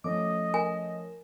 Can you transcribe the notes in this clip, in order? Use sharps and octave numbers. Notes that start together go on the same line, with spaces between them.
F3 A3 C#4 D#5 D6
A#4 G#5